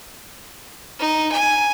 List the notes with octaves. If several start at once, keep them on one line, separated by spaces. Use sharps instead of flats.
D#4
G#5